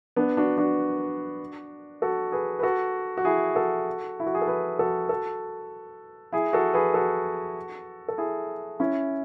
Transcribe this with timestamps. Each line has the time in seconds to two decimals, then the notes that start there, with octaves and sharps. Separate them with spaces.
0.16 B3 D4
0.37 D4 F#4
0.58 D4 F#4
2.02 F#4 A4
2.32 G#4 B4
2.59 B4
2.63 F#4 A4
3.17 F#4
3.25 E4 G#4
3.55 F#4 A4
4.20 E4
4.27 F#4
4.35 G#4
4.42 A4
4.48 G#4 B4
4.79 F#4 A4
5.09 F#4 A4
6.33 E4 G#4
6.53 F#4 A4
6.74 G#4 B4
6.94 F#4 A4
8.08 A4
8.18 E4 G#4
8.80 C#4 E4